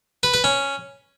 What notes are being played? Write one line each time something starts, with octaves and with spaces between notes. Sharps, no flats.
B4
B4
C#4